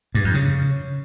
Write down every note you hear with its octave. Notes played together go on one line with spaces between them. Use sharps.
G2
F2
C#3